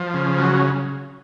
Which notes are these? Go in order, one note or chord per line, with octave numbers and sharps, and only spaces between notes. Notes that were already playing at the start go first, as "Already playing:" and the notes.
Already playing: F3
C#3
F#3